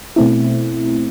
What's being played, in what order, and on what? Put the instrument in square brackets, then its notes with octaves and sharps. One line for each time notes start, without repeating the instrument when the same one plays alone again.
[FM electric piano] B2 A3 C4 E4